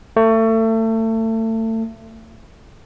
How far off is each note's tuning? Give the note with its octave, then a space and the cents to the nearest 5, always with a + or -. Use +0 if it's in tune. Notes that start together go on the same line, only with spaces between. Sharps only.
A3 +30